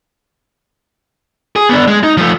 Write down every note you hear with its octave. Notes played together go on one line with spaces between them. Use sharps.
G#4
B3 D4
G#3
D#4
F3 A3